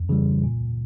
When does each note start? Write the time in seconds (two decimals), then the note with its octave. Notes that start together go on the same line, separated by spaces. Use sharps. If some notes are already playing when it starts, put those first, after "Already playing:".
Already playing: F2
0.09 C#3 E3 G3
0.44 A#2